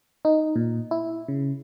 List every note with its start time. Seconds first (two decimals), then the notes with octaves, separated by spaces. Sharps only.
0.25 D#4
0.56 A#2
0.91 E4
1.28 C#3